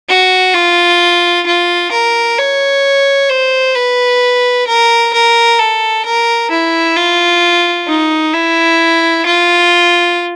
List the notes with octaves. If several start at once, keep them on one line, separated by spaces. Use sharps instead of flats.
F#4
F4
F4
A#4
C#5
C5
B4
A#4
A#4
A4
A#4
E4
F4
D#4
E4
F4